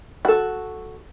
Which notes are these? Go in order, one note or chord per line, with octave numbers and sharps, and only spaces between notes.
F#4 A4